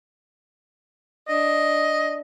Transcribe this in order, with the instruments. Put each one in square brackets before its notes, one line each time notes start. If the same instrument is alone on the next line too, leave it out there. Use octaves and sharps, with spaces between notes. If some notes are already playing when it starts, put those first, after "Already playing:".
[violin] D4 [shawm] D#5